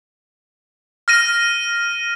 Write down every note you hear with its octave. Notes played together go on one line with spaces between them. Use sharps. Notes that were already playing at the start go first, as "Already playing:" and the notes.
F6 A#6 D#7